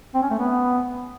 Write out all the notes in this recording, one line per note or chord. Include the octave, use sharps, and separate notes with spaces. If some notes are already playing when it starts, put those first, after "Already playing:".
C4
C#4
A3
B3